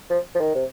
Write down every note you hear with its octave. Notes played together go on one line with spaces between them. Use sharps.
F3
F3
D#3
C3